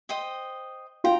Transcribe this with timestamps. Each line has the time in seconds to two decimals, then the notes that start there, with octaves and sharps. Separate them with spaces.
0.09 C5 D#5 G5
1.04 F4 G5 A#5